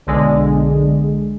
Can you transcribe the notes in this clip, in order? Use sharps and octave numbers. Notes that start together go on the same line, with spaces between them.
B1 D3 G#3